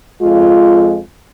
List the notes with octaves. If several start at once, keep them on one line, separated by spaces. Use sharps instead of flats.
F2 G#3 F4